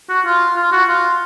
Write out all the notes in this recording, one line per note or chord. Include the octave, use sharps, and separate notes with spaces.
F#4
F4
F4
F#4
F4